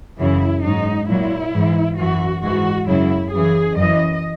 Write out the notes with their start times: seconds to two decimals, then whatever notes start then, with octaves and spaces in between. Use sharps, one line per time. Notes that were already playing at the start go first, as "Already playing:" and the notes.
0.18 F#2 C#3 E3 E4
0.64 G#2 F#3 D#4
1.08 A#2 F#3 E4
1.53 G#2 E3
1.98 F#2 E3 F#4
2.42 G#2 E3 F#4
2.87 F#2 C#3 F#3 E4
3.32 F#2 C#3 E3 G#4
3.76 F#2 E3 D#5